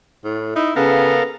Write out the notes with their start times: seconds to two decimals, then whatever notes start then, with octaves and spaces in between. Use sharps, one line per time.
0.24 A2
0.56 D#4 E4
0.76 C#3 B3 A4 A#4 F5